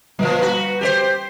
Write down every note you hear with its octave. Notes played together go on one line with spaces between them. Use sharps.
A#2 F3 G3
F#4 B4
G4 G#4 C5